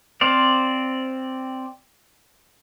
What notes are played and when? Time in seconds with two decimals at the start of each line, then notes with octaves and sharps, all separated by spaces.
0.21 C4 C5 D5 F5